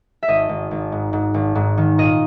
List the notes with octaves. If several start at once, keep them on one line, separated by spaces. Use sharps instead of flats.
E5
G#1 D#5
G#1
G#1
G#2
G#2
G#1
G#2
D#3
A#2 D#5